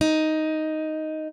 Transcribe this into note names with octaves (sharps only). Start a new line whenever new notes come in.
D#4